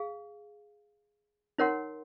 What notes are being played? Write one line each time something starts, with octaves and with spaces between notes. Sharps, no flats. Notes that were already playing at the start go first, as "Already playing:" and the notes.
Already playing: G#4 F5
D#4 A#4 C#5 F#5 C6